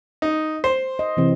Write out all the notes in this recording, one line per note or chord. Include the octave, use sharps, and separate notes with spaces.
D#4
C5
D#5
C3 E3 C4